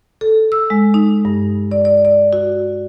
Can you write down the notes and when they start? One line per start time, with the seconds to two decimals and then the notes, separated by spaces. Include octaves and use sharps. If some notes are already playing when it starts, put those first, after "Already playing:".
0.21 A4
0.52 E6
0.70 G#3
0.94 D#4
1.25 G2
1.71 D5
1.85 D5
2.05 D5
2.33 F#4